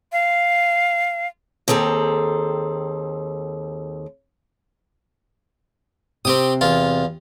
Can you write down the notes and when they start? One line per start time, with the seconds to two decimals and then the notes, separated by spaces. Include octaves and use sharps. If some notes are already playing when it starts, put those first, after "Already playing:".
0.12 F5
1.68 D#2 C4 G#4 A4 A#5
6.25 C3 C4 G4 D#6
6.61 E2 F4